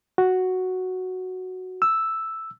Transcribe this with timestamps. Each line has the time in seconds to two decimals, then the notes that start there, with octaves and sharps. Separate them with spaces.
0.18 F#4
1.82 E6